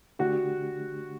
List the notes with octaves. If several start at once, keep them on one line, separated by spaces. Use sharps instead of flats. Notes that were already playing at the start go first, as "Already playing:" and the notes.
D3 A3 D4 F#4 G4